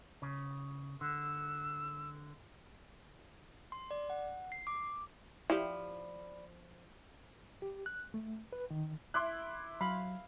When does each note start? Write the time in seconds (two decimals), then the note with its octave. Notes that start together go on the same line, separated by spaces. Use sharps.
0.22 C#3
1.01 D3 E6
3.72 C6
3.91 D5
4.10 F#5
4.52 C7
4.67 D6
5.50 F3 E4 G4 D5 B5
7.62 G4
7.86 F#6
8.14 A3
8.53 B4
8.70 D#3
9.14 E4 C6 D6 F#6
9.81 F#3 F5 B5